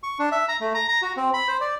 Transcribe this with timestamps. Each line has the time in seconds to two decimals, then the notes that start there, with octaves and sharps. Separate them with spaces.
0.03 C#6
0.19 D4
0.32 E5
0.48 A#5
0.60 A3
0.74 A#5
0.88 A#5
1.02 F#4
1.17 C4
1.33 B5
1.48 C5
1.61 D5